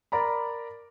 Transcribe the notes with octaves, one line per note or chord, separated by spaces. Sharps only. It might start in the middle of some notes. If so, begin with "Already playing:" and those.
A#4 D5 A#5 B5